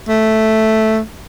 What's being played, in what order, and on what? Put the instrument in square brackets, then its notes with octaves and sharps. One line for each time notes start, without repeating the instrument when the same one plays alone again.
[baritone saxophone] A3